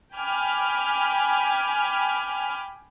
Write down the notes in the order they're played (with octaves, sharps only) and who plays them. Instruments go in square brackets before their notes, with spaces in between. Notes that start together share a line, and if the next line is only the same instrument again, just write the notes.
[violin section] G5 G#5 B5 D6 F6